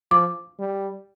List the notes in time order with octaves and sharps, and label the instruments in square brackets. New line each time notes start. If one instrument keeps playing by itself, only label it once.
[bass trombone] F3 [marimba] D6
[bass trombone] G3